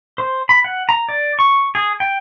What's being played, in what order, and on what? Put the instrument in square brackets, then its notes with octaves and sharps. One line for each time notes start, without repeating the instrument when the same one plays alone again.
[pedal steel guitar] C5
B5
F#5
A#5
D5
C#6
G#4
G5